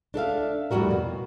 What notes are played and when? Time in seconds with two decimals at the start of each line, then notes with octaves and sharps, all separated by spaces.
0.14 D4 A4 E5 F5
0.71 F2 A2 G3 F#4 A#4
0.90 B2